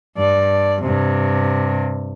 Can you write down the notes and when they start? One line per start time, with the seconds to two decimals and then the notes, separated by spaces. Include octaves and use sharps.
0.17 G2 D5
0.82 G2 C3